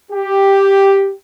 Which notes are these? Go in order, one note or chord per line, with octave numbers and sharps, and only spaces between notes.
G4